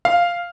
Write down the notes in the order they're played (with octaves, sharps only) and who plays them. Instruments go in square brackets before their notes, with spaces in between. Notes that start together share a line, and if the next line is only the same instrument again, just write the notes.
[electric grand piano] F5